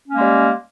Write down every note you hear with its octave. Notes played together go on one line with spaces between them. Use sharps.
G3 G#3 A#3 C#4